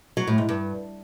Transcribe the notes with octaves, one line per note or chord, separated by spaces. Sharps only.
F#3
A2
G#2
G2